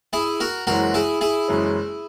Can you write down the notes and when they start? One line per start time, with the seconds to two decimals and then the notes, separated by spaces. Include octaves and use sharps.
0.13 E4 G#4
0.40 F#4 A#4
0.67 F#1 F#2 E3 G#3 C#4 F#4 A#4
0.94 E4 G#4
1.21 E4 G#4
1.48 F#1 F#2 E3 G#3 C#4